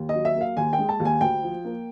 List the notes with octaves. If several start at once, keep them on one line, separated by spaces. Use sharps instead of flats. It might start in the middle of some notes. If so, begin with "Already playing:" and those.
Already playing: D#2
D#5
F#3
E5
A#3
F5
D#2 G#5
G5
G#3
A5
D#2
G#5
D2 G5
F3
A#3